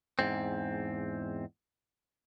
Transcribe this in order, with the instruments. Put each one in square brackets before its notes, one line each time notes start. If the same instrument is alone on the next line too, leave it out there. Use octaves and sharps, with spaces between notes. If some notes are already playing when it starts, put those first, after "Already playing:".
[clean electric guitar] E2 G#2 C4